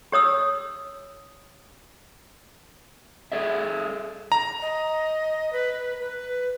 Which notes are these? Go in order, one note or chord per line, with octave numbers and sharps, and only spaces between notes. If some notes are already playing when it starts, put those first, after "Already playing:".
G4 C#5 D#6 E6
G#4 A4 D5 E5
A#5
D#5
B4
B4